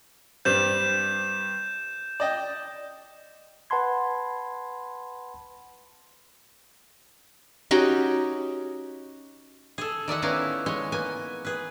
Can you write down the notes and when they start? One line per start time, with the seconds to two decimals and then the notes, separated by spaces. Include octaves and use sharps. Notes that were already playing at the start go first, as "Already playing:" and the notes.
0.45 G2 G3 C4 G6 E7
2.20 D5 D#5 G5
3.70 B4 F#5 A5 B5 C6 G#6
7.71 C#4 D#4 F#4 G4
9.78 G#4 A4
10.08 D#3 D5 E5 F#5
10.22 B3 C#4 D#4 E4 D5 F5
10.66 G#3 C#5 G#5
10.92 A#3 B3 G#5
11.45 G#4 B4